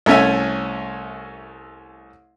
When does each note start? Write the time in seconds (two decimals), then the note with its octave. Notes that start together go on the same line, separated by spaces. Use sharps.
0.06 C2 A3 C#4 E5 G#5